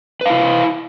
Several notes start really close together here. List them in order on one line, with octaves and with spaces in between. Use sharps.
B4 F5 E4